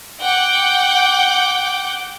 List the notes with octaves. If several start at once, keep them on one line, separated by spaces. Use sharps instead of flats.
F#5 G5 D6 G6